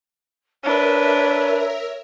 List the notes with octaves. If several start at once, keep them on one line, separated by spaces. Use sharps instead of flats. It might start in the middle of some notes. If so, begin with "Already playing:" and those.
D4 A#4 B4 C#5 E5